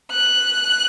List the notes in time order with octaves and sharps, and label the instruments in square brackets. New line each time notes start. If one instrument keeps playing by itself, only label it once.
[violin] F#6